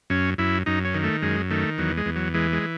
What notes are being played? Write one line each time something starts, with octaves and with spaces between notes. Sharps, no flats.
F#2 C#4
F#2 E4
F#2 D#4
C#4
D#3
A3
F#2 G#3
D#3 A3
E2 F#3
G#3
E2
F#3
E3 G#3
G#3